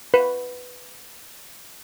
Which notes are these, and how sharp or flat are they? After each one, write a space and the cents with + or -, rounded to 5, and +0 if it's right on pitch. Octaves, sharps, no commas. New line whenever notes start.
B4 +5